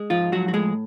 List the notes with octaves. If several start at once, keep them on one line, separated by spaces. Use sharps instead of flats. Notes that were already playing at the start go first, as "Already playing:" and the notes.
Already playing: G#3
G#2 F3 F4
F3 F#3 F#4
F#4
A2 G#3 G#4